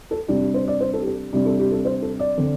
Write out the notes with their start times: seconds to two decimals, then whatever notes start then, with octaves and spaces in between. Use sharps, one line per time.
0.11 A4
0.28 C3 G3 D4 G4
0.41 G4
0.54 C5
0.68 D5
0.81 C5
0.94 A4
1.02 G4
1.06 A4
1.33 C3 G3 D4
1.46 A4
1.59 G4
1.72 A4
1.85 C5
2.02 A4
2.19 D5
2.38 D3 C4